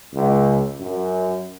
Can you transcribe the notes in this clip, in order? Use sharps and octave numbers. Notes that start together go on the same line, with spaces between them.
C#2
F#2